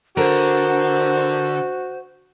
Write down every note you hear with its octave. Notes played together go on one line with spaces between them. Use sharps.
D3 F#4 A4 A#4 C5